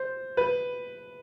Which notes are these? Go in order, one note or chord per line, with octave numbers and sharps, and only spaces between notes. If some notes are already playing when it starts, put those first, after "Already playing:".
Already playing: C5
B4